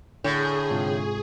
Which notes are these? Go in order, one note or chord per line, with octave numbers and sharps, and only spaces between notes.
A2 D3 G#4
G#2 C3 F4